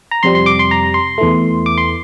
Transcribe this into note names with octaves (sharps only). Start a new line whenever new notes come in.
A#5
F2 C3 G3 C6
C6
D6
C6
A#5
C6
E2 E3 A3
D6
C6